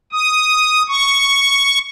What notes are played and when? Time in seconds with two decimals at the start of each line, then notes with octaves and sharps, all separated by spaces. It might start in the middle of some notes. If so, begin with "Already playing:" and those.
0.13 D#6
0.89 C#6